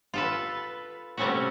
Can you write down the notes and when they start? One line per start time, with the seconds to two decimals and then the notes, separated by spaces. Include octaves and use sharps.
0.14 F4 A4 B4
1.17 C3 G3 A3 C4 C#4 F#4